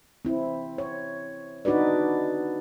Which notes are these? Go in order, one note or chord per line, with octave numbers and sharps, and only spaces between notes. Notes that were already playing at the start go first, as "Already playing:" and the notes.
C4 E4
C#5
D4 D#4 F#4 B4 D5